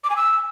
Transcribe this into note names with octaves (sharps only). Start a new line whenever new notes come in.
D6
G#5
E6